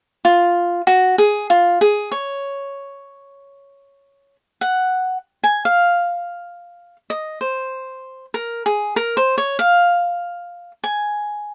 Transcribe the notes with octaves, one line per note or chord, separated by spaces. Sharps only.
F4
F#4
G#4
F4
G#4
C#5
F#5
G#5
F5
D#5
C5
A#4
G#4
A#4
C5
C#5
F5
G#5